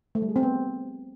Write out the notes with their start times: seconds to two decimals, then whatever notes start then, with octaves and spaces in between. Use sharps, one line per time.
0.15 A3
0.22 G3
0.29 G#4
0.36 C4
0.43 B3